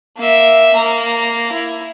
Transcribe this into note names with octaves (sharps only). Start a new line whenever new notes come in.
A#3 E5
A#3 A#5
E4